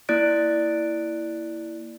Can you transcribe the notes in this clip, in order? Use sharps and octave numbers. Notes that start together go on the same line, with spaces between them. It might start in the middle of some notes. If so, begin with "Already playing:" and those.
A#3 E4 D5 F#6 A6 D7